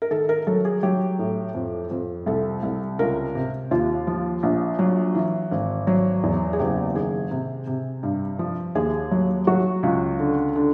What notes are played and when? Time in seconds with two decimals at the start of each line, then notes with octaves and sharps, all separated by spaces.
0.02 A#4
0.11 D#3 A4
0.29 A#4
0.47 F#3 A4
0.65 G#4
0.83 F#3 G4
1.19 A2
1.55 F2
1.91 F2
2.26 C2 A4
2.63 C2
2.99 C#2 A#4
3.35 C3
3.71 D#2 F4
4.07 F3
4.43 A#1
4.79 F#3
5.15 E3
5.51 G#1
5.87 F#3
6.23 E2
6.53 G#4
6.59 F#1 G4
6.95 D#3 G#4
7.31 C3
7.67 C3
8.03 G2
8.39 F3
8.75 D#2 G#4
9.11 F#3
9.47 F#3 F#4
9.83 C#2
10.19 D3
10.56 D3